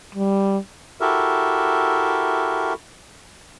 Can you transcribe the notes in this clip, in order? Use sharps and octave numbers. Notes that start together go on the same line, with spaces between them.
G3
E4 F#4 G4 A4 A#4 E5